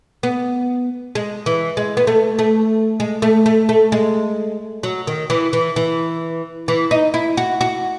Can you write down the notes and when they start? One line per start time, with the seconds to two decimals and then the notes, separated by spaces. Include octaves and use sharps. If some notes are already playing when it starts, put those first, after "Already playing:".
0.23 B3
1.15 G#3
1.46 E3
1.77 G#3
1.97 B3
2.07 A3
2.39 A3
3.00 G#3
3.22 A3
3.46 A3
3.69 A3
3.92 G#3
4.83 F#3
5.07 D#3
5.30 E3
5.53 E3
5.76 E3
6.68 E3
6.91 D#4
7.14 E4
7.37 F#4
7.61 F#4